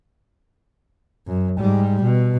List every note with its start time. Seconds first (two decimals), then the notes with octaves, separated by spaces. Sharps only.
1.27 F#2
1.59 G#2 G3
2.02 B2